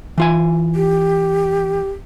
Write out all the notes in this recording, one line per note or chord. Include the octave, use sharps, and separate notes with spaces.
E3 F4 G#5
G4